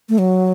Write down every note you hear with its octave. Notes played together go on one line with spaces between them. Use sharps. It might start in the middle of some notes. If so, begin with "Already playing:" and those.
A3
F#3